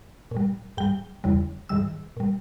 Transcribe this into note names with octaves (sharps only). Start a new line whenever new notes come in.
A#2
G3
G#2 G3 G5
E2 C#3 G3
G#2 D#3 G3 E6
A#2 G3